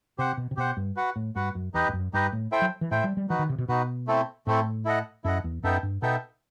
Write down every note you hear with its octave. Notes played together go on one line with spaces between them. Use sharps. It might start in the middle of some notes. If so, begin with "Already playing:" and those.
C3 G4 C5 F#5
B2
C3
B2 G4 C5 F#5
G2
F#4 B4 F#5
A2
G2 F#4 B4 F#5
F#2
E2 D#4 G4 B4 D#5
G2
F#2
G2 D#4 G4 B4 D#5
A2
E4 A4 C5 E5 G5
F#3
E3
A2 E4 A4 C5 E5 G5
G3
G3
E3 D#4 F#4 B4
D#3
C3
B2
B2 D#4 F#4 B4
A3 C4 E4 A4
A2 A3 C4 E4 A4
E4 A4 D#5 F#5
F#2 E4 A4 D#5 F#5
E2
F#2 B3 D#4 A4 E5 G5
G2
B2 B3 D#4 A4 E5 G5